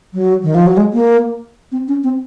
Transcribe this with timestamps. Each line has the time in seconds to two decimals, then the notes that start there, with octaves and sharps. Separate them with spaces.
0.14 F#3
0.43 D#3
0.55 F3
0.66 F#3
0.77 G#3
0.93 A#3
1.72 C4
1.88 C#4
2.03 C4